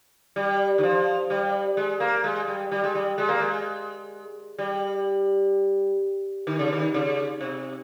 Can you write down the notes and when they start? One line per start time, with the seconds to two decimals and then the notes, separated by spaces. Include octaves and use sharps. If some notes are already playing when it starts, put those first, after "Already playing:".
0.36 G3
0.78 D#3
0.83 F3
1.30 G3
1.77 G#3
2.00 A#3
2.24 G#3
2.48 G3
2.71 G3
2.84 G#3
2.95 G3
3.18 G#3
3.29 A#3
3.40 G#3
4.59 G3
6.47 D#3
6.59 C#3
6.73 D#3
6.94 C#3
7.41 C3